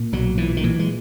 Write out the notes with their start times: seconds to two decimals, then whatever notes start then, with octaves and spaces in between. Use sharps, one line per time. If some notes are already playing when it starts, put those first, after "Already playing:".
Already playing: A#2
0.12 B1 F#3
0.37 A#2 E3
0.57 D#3
0.63 A#2 E3
0.79 G#3